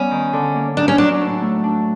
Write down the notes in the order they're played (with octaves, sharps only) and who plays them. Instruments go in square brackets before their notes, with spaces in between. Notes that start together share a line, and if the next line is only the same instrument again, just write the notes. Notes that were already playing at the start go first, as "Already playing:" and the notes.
Already playing: [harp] G3 B3 [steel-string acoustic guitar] C#4
[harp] D#3
D3
A#3
[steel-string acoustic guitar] D4 [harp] D#4
[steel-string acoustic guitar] C#4
[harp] F#3 [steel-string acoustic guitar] D4
[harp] A2
A3
D4